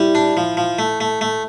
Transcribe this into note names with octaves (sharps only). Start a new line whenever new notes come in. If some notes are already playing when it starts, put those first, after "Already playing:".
Already playing: G3 E4
D4
F3
F3
A3
A3
A3